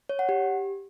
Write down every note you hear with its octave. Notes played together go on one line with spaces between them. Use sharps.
C#5
F#5
G4